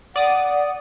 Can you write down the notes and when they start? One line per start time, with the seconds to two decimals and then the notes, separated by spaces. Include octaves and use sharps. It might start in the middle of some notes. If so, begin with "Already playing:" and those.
0.16 D5 F#5 D#6